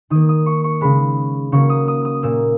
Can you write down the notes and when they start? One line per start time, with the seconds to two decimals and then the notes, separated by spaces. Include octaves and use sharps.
0.10 D#3 A#3 D#6
0.29 D#6
0.46 C#6
0.64 C#6
0.81 C#3 G#3 B5
1.52 C#3 F#3 A#3 C#6
1.70 D#6
1.88 D#6
2.05 D#6
2.23 A#2 A#3 E6